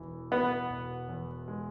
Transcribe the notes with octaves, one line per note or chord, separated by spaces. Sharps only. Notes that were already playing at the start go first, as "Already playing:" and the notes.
Already playing: E1 E2 E3
B2 B3
E1
E2
G#3